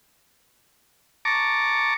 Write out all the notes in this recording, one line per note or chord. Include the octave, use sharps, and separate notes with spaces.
A5 A#5 C#6 D6